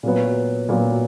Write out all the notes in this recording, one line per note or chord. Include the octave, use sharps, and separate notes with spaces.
A#2 F#3 B3
A#2 F#3 B3